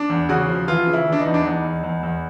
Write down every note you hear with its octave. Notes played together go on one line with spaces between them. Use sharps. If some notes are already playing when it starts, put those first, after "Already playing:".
Already playing: D4
E2
C#3 F#4
F3
E3 F4
C#3
E4
E3
D4
D#4
E2
D4
E2 D#4
E2
E2
E2